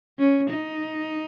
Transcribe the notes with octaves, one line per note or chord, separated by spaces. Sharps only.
C#4
D#4